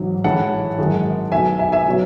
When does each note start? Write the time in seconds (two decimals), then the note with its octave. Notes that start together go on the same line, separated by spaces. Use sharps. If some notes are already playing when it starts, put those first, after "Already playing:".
Already playing: A1 G#2 F#3
0.24 A1 A2 G#3 C#4 E4 F#5 A5
0.78 G#1 F#2 D#3 G#3
1.32 B1 B2 A3 E5 G#5
1.59 E5 G#5
1.72 E5 G#5
1.88 B2 F#3 C#4